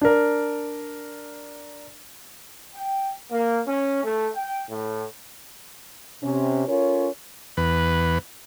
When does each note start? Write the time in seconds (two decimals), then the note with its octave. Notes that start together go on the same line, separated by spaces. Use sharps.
0.01 D4 A#4
2.75 G5
3.31 A#3
3.66 C#4
4.03 A3
4.34 G5
4.69 A2
6.23 C3 C#4
6.67 C#4 F4 A4 A#4 C#5
7.57 E2 B4